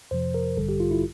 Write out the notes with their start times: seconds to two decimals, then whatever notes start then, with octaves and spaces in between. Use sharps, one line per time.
0.11 F2 C3 F3 C5
0.34 A#4
0.57 A1 G2 D3 G3 A4
0.69 G4
0.80 F4
0.91 E4